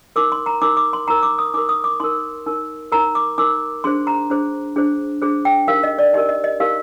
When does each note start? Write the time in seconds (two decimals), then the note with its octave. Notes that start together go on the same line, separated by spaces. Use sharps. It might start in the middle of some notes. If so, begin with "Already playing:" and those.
0.16 D#4 A#4 D6
0.32 C6
0.46 A#5
0.62 D#4 A#4 D6
0.77 D6
0.93 C6
1.08 D#4 A#4 A#5
1.23 D6
1.39 D#6
1.54 D#4 A#4 D6
1.69 D#6
1.84 D6
2.00 D#4 A#4 C6
2.46 D#4 A#4
2.92 D#4 A#4 A#5
3.15 D6
3.38 D#4 A#4 D6
3.84 D4 G#4 C5 C6
4.07 A#5
4.30 D4 G#4 C5
4.76 D4 G#4 C5
5.22 D4 G#4 C5
5.45 G5
5.67 D#4 G4 A#4 F5
5.83 D#5
5.98 D5
6.14 D#4 G4 A#4 D#5
6.29 D#5
6.44 D#5
6.60 D#4 G4 A#4 F5